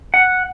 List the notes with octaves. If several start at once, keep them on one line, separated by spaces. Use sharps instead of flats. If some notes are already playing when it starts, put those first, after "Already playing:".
F#5